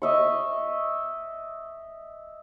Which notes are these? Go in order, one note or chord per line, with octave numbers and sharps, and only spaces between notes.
D#5 E5 C#6